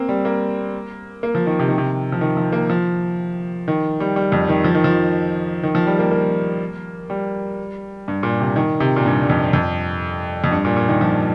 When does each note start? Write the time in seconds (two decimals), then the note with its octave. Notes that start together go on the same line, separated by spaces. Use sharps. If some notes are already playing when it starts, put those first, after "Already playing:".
Already playing: A#3 C4
0.09 G3
0.25 A#3
1.23 A#3
1.35 F3
1.47 D#3
1.59 C3
1.69 D#3
1.78 C3
2.12 F3
2.21 D#3
2.37 F3
2.52 A#3
2.70 F3
3.68 D#3
4.00 G3
4.16 G3
4.32 F2
4.49 D#3
4.64 F3
4.75 D#3
4.84 F3
5.63 D#3
5.75 F3
5.87 G3
5.99 A#3
6.11 A#3
7.10 G3
8.08 G2
8.23 A#2
8.40 C3
8.56 D#3
8.80 C3
8.96 A#2
9.06 G2
9.21 G2
9.30 F2
9.53 F2
10.44 F2
10.51 G2
10.65 A#2
10.77 A#2
10.89 D#3
11.01 F3